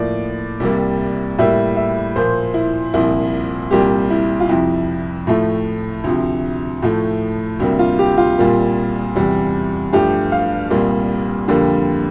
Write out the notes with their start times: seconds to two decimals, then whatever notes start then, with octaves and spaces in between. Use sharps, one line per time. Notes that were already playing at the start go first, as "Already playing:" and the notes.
Already playing: A2 F3 A#3 D5
0.60 C2 C3 G3 A#3
1.39 A2 G3 A#3 E5
1.76 E5
2.16 A#2 F3 A#3 C5
2.54 E4
2.94 C2 A#2 F3 E4
3.71 C2 A#2 G3 A#3 G4
4.10 E4
4.40 F4
4.49 F2 C3 F3 E4
5.27 A2 F3 A3
6.04 D2 C3 F3
6.82 A2 F3 A3
7.60 D2 C3 G3 A#3
7.79 F4
7.99 G4
8.18 F4
8.38 C2 A#2 G3 A#3
9.16 E2 C3 G3
9.93 G2 F3 A3 G4
10.32 F5
10.70 C2 A#2 G3 A#3
11.48 F2 D3 G3 A#3